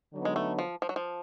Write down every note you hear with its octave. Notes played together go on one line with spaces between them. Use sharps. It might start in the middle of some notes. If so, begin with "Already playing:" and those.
D3 F#3 B3 D#4
G#3
A3
F3
F3
F#3
F3